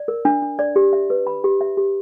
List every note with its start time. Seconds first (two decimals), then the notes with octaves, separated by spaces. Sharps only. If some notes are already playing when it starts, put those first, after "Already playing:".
Already playing: D5
0.08 A#4
0.25 D4
0.42 D4
0.59 D5
0.76 G4
0.93 E5
1.10 B4
1.27 B5
1.44 G4
1.61 E5
1.77 G4